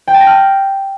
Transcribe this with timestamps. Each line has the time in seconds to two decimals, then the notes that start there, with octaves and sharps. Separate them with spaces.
0.08 G5
0.14 A5
0.21 A#6
0.27 F6